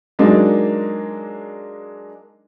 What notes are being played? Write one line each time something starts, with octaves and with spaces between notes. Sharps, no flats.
F#3 G#3 A#3 D4 D#4